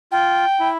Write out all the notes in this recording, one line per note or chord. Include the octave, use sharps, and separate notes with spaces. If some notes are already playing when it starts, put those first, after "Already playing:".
F4 G5
E4